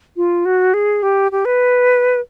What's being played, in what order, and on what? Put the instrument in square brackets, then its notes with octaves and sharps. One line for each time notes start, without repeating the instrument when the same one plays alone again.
[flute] F4
F#4
G#4
G4
G4
B4